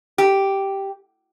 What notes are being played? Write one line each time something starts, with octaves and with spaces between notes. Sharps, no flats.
G4